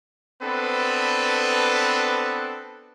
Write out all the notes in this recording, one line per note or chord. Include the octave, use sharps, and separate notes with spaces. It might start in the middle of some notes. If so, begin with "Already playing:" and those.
B3 C4 D4 A4 B4